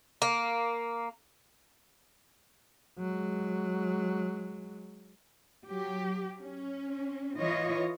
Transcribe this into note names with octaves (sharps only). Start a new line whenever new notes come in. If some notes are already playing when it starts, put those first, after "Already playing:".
A#3
F#3 G#3
F#3 G4
C#4
E3 F4 C#5 D#5